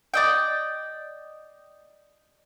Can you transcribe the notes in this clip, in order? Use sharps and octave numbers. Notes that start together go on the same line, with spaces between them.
D5 D#5 G5